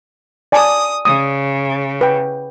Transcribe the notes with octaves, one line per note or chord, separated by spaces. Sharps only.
D5 G#5 A5 D#6
C#3 D#6
B4 G5